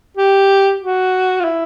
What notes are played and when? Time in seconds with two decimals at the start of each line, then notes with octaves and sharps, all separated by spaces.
0.17 G4
0.81 F#4
1.40 F4
1.44 E4